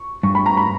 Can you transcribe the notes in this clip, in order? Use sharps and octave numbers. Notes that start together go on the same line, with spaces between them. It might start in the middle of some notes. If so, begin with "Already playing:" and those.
Already playing: C#6
G2 C#6
B5
A#5
B5